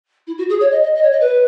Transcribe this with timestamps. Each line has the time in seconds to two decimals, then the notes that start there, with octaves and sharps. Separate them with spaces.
0.27 E4
0.38 F#4
0.49 G#4
0.60 C#5
0.71 D#5
0.83 D#5
0.95 D#5
1.03 C#5
1.12 D#5
1.20 B4